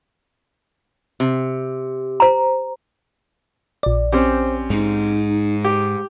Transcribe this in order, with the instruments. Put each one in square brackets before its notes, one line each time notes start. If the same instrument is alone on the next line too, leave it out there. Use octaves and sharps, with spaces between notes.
[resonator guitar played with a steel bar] C3
[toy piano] C5 A#5
[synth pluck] A#1 D5
[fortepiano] C4 C#4 G4 [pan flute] C5
[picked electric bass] G#2 [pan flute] D#4
[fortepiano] G4